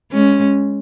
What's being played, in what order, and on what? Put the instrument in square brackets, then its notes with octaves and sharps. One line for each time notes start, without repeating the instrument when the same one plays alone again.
[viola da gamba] G#3 C#4